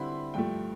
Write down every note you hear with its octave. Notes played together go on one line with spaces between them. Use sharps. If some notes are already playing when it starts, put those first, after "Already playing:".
Already playing: D3 G3 C4 E4 B5 C6
G2 F3 A3 G5